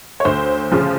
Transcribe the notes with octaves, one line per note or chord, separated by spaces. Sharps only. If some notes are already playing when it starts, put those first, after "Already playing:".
C#5
D2 C5
C#3 F3